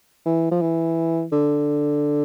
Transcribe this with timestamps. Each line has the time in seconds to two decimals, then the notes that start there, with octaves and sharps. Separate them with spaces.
0.26 E3
0.51 F3
0.61 E3
1.32 D3